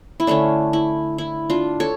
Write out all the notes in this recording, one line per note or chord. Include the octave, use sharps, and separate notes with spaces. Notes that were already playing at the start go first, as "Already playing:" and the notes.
E4
D3 A3 C#4 D4
E4
E4
D4 F4
A4 C#5